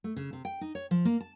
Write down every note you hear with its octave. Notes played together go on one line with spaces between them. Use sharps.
A3
C#3
C3
G5
D#4
C#5
F3
A#3
A5